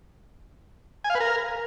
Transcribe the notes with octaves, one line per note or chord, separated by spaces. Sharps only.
G#5
F5
B4
A#4